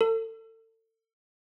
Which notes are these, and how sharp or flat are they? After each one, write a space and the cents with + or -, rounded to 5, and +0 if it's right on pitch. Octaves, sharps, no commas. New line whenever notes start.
A4 +35